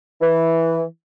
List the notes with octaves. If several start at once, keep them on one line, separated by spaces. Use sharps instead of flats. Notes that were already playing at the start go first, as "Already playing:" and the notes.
E3